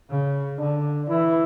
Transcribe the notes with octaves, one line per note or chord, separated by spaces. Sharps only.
C#3
D3 D4
E3 E4